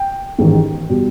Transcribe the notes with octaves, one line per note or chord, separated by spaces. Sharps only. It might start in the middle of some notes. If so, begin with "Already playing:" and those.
Already playing: G5
A1 G#2 D#3
B2 G3